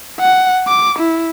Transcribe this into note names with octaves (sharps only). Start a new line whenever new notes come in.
F#5
D6
E4